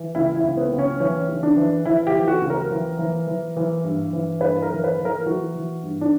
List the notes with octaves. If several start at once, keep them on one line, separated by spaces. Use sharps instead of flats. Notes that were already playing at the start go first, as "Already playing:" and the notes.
Already playing: E3
C#2 E4
E4
C#2
B3
C#2
C#4
E3 C#4
C#3
D4
E3
E3 E4
G4
E3
F#4
C#2
A#4
E3
E3
E3
E3
G2
E3
G2 B4
A#4
E3
B4
E3
A#4
E3 F#4
E3
G2
D4